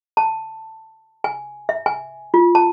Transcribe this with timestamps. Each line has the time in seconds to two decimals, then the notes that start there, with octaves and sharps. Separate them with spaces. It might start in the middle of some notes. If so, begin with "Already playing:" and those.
0.17 A5
1.24 G#5
1.69 E5
1.86 G#5
2.34 F4
2.55 A5